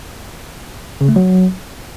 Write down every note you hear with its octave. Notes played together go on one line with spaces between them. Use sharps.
C#3
A3
F#3